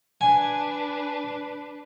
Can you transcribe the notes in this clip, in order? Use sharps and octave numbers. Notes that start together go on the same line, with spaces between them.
D4 B4 G#5